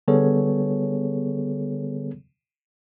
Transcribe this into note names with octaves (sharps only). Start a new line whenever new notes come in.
D3 G3 B3 G#4 A4 C#5